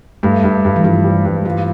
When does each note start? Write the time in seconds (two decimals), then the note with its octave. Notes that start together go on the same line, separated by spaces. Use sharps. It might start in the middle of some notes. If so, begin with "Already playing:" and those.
0.23 G2 A3
0.44 G2
0.65 G2
0.76 E3
0.84 G2 F3
1.04 G3
1.25 G2
1.45 E3 F4